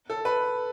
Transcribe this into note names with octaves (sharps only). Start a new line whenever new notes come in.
A4
B4